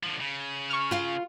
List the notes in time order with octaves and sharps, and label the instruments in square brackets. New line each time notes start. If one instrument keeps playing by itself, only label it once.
[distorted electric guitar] D3 F3
C#3
[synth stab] C#6 F6
[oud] F4 F5